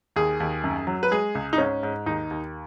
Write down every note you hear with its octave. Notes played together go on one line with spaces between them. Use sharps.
D#2 G#4
D#2
F#2
F#3
B4
G#3 G#4
C#2
D#4
G#2 C#4
G#2
D#2 D#4
D#2